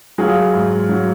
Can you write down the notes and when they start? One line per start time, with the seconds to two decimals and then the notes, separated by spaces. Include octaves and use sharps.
0.18 F#3 F4 G#4
0.54 G#2
0.89 F#3